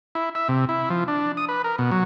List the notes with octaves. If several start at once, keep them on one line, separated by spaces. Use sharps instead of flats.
E4
E5
C3
E4
F3
D4
D#6
B4
A#4
B2
F#3